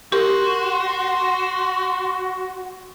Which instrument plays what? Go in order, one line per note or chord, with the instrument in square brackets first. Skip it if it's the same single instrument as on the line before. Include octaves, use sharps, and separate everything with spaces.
[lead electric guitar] F#4 [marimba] G4 A#4 [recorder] C6